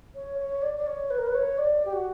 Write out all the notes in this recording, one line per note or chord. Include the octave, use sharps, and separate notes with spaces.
C#5
C#5
D5
D5
C#5
B4
A#4
B4
C#5
D5
G4
F#4